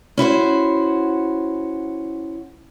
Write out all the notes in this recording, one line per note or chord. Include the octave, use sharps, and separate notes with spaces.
C#4 E4 F#4 C5